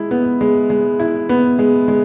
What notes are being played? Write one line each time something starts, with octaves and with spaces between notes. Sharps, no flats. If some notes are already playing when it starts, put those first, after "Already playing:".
Already playing: G#3 E4
B3
G#3
G#3
E4
B3
G#3
G#3